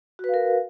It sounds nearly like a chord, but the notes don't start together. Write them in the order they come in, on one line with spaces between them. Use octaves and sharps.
F#4 B4 F5 A#4